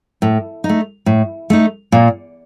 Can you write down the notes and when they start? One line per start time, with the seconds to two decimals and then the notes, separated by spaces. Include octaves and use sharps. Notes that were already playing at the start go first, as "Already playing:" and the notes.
0.22 A2
0.64 D#4
0.69 A3
1.06 A2
1.50 A3 D#4
1.92 A#2